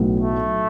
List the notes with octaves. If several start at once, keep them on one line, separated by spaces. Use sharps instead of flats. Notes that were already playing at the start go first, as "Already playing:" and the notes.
Already playing: B1 A2 F#3 B3
A3